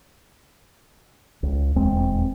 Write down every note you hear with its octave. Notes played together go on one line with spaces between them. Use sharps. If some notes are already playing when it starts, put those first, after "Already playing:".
C#2
D#1 E2 G#3 C4